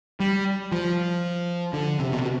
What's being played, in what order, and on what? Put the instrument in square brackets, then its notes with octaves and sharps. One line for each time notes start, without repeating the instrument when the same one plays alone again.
[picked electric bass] G3
F3
D3
C3
B2